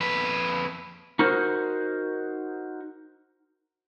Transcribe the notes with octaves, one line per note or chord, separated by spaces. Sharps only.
F2 B4
D#4 F#4 A#4 C5